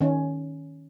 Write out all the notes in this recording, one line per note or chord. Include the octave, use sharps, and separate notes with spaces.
D#3 C#4